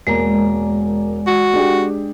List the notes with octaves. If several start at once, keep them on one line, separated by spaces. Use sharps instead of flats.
E1 G#3 A#3 D5 A#5
F#4
G#3 D4 G4